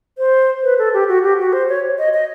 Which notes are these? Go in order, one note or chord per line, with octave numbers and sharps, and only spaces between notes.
C5
B4
A4
G4
F#4
G4
F#4
C5
C#5
D#5
D#5